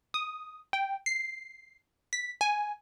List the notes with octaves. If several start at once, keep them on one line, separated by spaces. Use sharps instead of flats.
D#6
G5
C7
B6
G#5